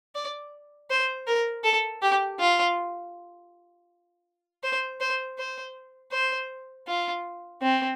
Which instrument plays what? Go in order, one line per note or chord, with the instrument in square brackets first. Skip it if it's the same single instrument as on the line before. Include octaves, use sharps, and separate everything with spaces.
[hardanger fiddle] D5
C5
A#4
A4
G4
F4
C5
C5
C5
C5
F4
C4